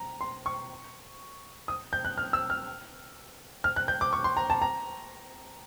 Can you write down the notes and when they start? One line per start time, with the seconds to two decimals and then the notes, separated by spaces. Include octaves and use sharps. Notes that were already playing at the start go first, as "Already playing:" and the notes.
Already playing: A#5
0.21 C6
0.46 C#6
1.68 D#6
1.93 G6
2.05 F#6
2.18 F6
2.33 E6
2.50 F6
3.64 F6
3.76 F#6
3.88 G6
4.01 D6
4.13 C#6
4.24 C6
4.37 A#5
4.50 A5
4.62 A#5